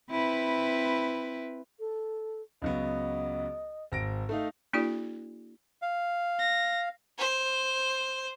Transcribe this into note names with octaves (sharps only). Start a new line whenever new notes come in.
C4 E4 B4
A4
C#2 F#3 B3 D#5
G#1 A#6 D7
A3 D#4 F5
A#3 D4 E4 F#4 G#4 D5
F5
A#6
C5